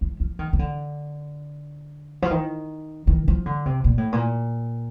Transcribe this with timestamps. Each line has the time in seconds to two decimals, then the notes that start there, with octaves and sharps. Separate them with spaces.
0.01 F3
0.20 F3
0.39 D#3
0.53 D#3
0.59 D3
2.22 F3
2.31 D#3
3.07 D#3
3.28 F3
3.46 D3
3.66 C3
3.84 A#2
3.98 A2
4.12 A#2